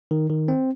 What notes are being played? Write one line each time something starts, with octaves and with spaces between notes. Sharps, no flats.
D#3
D#3
C4